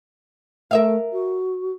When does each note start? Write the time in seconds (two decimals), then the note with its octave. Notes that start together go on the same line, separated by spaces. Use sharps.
0.71 A3 A#4 E5 F5
1.12 F#4